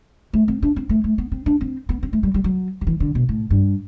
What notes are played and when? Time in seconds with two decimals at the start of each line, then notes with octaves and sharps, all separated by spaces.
0.33 A3
0.48 C4
0.62 D4
0.76 C4
0.89 A3
1.04 A3
1.18 B3
1.32 C4
1.46 D4
1.61 C4
1.89 B3
2.03 C4
2.13 A3
2.23 G3
2.34 G3
2.44 F#3
2.81 F#3
2.87 E3
3.00 D3
3.15 B2
3.29 A2
3.50 G2